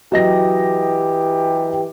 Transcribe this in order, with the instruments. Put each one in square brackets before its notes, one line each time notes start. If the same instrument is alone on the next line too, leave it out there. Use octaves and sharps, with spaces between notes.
[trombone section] E3 G4 [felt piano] F#3 D#5 A#6